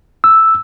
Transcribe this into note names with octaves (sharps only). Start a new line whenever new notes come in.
E6